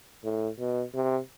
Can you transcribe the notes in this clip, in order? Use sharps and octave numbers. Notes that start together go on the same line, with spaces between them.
A2
B2
C3